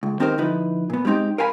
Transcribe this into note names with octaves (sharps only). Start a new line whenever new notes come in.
C#2
D#3 C4 D#4 G4 A#4 C5
D3 F3 D#4 E4 B4
A#2 B3
G3 G#3 C4 D#4 G4
A#4 F5 G#5 A5 B5